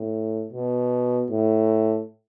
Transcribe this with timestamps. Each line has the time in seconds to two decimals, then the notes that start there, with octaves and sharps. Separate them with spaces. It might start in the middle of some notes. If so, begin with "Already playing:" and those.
Already playing: A2
0.53 B2
1.31 A2